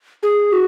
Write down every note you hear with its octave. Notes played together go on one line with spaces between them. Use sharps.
G#4
F#4